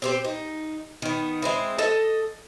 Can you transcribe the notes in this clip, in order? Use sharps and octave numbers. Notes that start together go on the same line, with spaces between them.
C4 G4 C5
D#4
D#3 B3
G#3 C4 E4
A4 D#5 A5